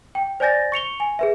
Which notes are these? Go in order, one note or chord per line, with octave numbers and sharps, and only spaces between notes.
G5
C5 D5 G#5 G6 A6 A#6
C#6 C#7 F7 G7
G#5
G#4 B4 E5